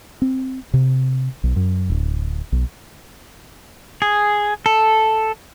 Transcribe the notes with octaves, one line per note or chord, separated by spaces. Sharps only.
C4
C3
B1
F#2
D1
B1
G#4
A4